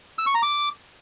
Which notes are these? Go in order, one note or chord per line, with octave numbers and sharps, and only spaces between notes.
E6
C#6
A#5
D6